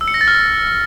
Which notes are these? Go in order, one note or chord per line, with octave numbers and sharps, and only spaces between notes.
E6
C#7
A#6
A6
F6